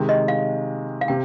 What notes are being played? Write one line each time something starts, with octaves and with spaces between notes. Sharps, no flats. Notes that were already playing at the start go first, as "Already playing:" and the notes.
Already playing: C3 D#3 G#3
D#5
F5
F5
C3 G5